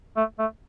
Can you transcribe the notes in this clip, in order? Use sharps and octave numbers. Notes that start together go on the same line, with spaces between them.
A3
A3